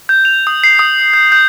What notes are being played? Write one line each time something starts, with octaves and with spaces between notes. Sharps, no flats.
G6
F7
D#6
C7
D#6
G6
G6